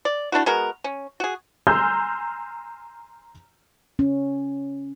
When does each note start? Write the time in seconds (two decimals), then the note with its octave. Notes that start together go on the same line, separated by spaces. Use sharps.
0.05 D5
0.32 A3 D4 E4 F#4
0.46 G#3 B3 F#4 A#4
0.84 C#4
1.20 F#4 G#4
1.67 G#5 A#5 C6 E6 F6 G6
3.99 C#4